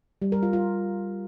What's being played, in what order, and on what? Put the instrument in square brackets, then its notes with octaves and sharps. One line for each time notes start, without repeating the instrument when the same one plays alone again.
[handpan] G3
A#4
F4
F4